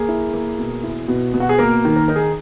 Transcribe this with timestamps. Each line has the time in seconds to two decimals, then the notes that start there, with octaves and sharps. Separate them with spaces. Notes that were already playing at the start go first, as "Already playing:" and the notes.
Already playing: A#3 G#4
0.08 E4
0.34 A#3
0.58 B2
0.83 E4
1.08 B2
1.34 B2
1.40 F#4
1.49 G#4
1.58 A#3 A#4
1.85 D#3
1.96 A#4
2.08 D#4 A#4
2.16 G#4